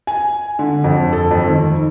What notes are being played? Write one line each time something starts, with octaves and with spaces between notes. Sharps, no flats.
G#5
D3
F2
A4
F2
D#3